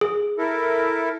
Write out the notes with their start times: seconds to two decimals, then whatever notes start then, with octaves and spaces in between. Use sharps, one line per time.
0.01 G#4
0.38 E4 A4 A#4